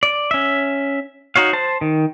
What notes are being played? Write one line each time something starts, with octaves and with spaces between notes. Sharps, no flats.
D5
C#4 E5
D#4 F#4 C#5 F5
C5 A5
D#3